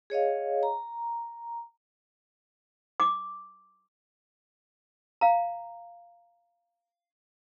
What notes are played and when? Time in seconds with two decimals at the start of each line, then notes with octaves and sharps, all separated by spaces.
0.10 G#4 C#5 D#5 F5
0.63 A#5
3.00 D6
5.21 F5 A#5